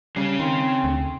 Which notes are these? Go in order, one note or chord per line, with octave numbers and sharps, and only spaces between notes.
C#3 G3 C#4
D#3 C4
D2